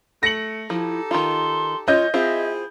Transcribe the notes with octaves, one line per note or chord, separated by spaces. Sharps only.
A3 A#6 C#7 F#7
F3 D#4 E4 G4 A4
D#3 F4 C6
C#4 F4 D#5 G6
C4 E4 F4 G#4 E5